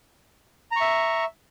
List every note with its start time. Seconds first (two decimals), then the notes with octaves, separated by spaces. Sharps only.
0.72 A#5
0.76 C#6
0.81 E5